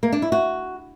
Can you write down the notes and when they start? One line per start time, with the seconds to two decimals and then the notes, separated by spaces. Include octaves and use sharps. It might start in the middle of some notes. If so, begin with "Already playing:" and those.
0.03 A#3
0.12 D4
0.22 E4
0.32 F#4